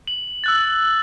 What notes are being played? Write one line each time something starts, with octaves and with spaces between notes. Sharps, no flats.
F#7
E6 F#6 A6